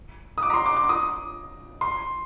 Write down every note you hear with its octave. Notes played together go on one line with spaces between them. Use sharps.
D#6
D6
A#5
C6
D6
D6
D#6
C6